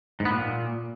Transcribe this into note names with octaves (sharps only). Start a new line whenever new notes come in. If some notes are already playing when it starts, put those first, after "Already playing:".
G#2
B3
A#2